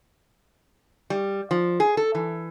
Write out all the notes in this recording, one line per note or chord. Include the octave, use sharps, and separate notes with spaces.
G3
F3
G#4
A4
E3